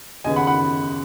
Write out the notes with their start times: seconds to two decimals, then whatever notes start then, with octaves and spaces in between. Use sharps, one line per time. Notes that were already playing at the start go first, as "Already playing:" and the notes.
0.24 D#2 C#3 B3 D#5 G#5
0.36 F#5 B5
0.47 F#5 B5